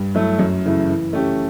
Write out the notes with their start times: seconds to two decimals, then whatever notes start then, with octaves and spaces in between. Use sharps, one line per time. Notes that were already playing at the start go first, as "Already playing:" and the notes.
Already playing: G2
0.15 F#3 A3 E4
0.39 F#2
0.65 C#3 E3 A3 E4
0.89 E3
1.13 A3 C#4 G4